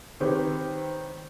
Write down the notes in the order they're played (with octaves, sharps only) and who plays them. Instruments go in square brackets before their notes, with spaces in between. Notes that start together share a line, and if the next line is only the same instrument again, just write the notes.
[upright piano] D#3 C4 G4 B4 C#5